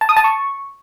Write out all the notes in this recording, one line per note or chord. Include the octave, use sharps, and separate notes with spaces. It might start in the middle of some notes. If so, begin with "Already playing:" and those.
A5
D#6
A5
C#6